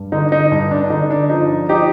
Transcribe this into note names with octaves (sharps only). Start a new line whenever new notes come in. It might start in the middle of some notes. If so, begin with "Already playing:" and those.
Already playing: G2
D3 D#4
D#4
G2
D4
D4
D3 D#4
D4
F3 D#4
F3 D#4 G4